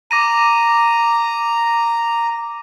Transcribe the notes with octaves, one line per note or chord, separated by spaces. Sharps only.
A#5 D6 A#6 D#7